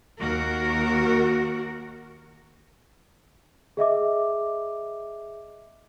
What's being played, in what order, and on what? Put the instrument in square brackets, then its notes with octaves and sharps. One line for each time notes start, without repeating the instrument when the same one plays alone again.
[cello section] D#2 F#4 A#4
[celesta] G#4 D#5 E5 D6